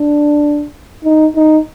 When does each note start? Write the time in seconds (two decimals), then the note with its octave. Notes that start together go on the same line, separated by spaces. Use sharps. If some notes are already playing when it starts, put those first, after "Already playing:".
Already playing: D4
1.04 D#4
1.36 D#4